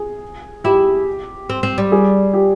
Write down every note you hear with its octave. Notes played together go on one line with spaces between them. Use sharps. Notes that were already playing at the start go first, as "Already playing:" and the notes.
Already playing: G#4
E4 G4
C4
C4
G3
G#4
G4